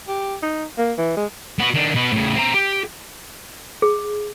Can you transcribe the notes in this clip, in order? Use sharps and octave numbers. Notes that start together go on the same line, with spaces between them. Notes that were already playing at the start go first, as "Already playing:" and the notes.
G4
D#4
A#3
E3
G#3
B3 F#4
D#3 D4
B2 B4
A2 C#3
C4 A#5
G4
G#4